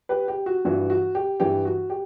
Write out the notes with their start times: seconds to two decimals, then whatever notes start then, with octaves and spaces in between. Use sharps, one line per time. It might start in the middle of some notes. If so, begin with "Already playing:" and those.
0.09 G4 B4
0.28 G4
0.46 F#4
0.65 G2 E3 F#4
0.90 F#4
1.15 G4
1.40 G2 E3 G4
1.65 F#4
1.90 G4